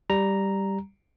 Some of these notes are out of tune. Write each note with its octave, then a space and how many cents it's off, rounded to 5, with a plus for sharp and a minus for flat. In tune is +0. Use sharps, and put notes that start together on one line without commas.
G3 +0 A#5 +0